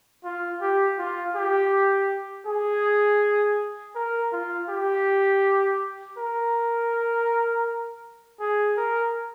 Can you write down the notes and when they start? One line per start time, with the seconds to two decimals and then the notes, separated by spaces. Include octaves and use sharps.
0.24 F4
0.62 G4
0.99 F4
1.35 G4
2.47 G#4
3.95 A#4
4.32 F4
4.70 G4
6.18 A#4
8.40 G#4
8.77 A#4